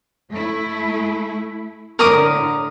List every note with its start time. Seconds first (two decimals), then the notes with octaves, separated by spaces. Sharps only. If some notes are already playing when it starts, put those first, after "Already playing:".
0.32 A3 E4
1.99 A2 D3 A#4 D6 D#6